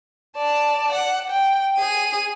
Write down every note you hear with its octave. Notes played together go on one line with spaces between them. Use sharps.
D5 A5
F#5
G5
G#4 D#7